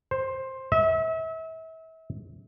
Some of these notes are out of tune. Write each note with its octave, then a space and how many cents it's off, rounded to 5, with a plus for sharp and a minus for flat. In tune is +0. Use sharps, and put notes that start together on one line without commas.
C5 +15
E5 -35